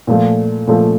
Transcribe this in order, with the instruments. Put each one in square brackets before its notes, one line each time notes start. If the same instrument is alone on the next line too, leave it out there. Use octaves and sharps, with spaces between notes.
[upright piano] A#2 F3 A3
A#2 F3 A3